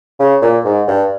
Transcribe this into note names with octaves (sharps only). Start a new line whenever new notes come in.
C#3
A#2
G#2
G2